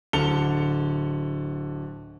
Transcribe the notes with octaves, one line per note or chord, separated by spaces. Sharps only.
D1 D3 A5 C#7 F7 G7